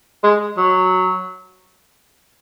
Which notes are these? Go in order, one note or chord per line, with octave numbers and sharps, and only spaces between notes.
G#3
F#3